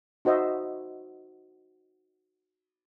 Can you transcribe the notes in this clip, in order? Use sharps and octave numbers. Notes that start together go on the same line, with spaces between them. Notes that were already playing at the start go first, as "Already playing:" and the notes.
D#4 F#4 C5 D#5 E5